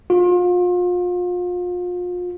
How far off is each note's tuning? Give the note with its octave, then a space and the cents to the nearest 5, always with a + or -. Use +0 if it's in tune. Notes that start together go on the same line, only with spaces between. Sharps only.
F4 +35